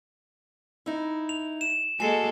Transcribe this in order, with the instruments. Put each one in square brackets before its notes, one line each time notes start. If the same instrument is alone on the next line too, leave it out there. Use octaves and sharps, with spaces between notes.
[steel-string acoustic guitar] D#4 E4
[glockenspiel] F7
E7
[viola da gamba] G#3 A#3 A4 [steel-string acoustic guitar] F#4 [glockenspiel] G#5 C7